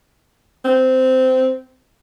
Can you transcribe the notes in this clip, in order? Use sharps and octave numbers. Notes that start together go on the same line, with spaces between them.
C4